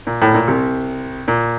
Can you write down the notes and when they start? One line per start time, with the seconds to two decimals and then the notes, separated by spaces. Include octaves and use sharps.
0.07 A#2
0.22 A2
0.34 A#2
0.47 C2 C3
1.28 A#2